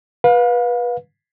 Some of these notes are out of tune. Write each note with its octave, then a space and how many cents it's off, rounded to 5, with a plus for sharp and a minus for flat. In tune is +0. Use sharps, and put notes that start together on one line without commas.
B4 -20 F5 +30